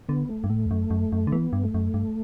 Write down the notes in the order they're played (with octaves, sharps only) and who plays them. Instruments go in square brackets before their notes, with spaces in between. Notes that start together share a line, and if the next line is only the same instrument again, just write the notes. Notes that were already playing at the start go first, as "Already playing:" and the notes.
[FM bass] D3 [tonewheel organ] B3
[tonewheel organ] A3
[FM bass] G2
[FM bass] A2 [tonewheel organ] A3
[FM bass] E2
F#2
F#2
F#2
D3
[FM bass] E3 [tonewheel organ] B3
[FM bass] G2
[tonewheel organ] A3
[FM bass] F#2
G2